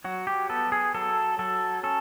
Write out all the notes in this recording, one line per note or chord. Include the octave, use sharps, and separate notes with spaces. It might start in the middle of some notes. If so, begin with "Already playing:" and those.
F#3 F#4
G4
B3 A4
G#4
F#3 A4
F#3 A4
C#4 A4